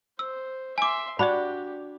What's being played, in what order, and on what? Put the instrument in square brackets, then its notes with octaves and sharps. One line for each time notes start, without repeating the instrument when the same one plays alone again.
[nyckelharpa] C5 [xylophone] E6
[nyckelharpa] E5 C6 [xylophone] G#5 D6
[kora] D4 F#4 [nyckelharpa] G4 [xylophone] D5 B5